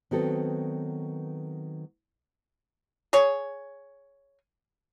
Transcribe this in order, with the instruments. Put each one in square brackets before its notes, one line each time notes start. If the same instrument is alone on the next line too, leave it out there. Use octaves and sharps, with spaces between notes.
[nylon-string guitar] D#3 F#3 B3 C4 F#4 A4
[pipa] G#4 C#5